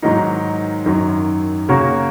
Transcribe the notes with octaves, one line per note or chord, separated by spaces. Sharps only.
G#2 D#3 F#3 D#4 A#4
F#2 D#3 F#3
C#3 A#3 F#4 A#4 C#5